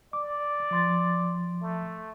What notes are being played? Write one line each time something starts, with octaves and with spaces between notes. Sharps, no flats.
D5 D6
F3 C6 A6
A3